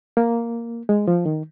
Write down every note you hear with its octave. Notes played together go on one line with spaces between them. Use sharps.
A#3
G#3
F3
D#3